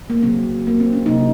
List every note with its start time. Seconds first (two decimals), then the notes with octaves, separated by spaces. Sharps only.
0.10 A#3
0.22 C#3 F#3 A#3 C4
0.67 A#3
0.80 C4
0.93 C#4
1.06 C3 F#3 A#3 D#4